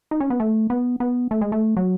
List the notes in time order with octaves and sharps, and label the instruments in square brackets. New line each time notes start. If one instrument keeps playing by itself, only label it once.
[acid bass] D#4
C#4
B3
A3
B3
B3
A3
G#3
A3
F#3